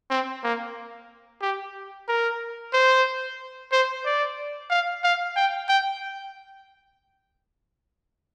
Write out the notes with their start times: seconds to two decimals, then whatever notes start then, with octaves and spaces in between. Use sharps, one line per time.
0.10 C4
0.44 A#3
1.42 G4
2.08 A#4
2.73 C5
3.72 C5
4.05 D5
4.70 F5
5.04 F5
5.36 G5
5.69 G5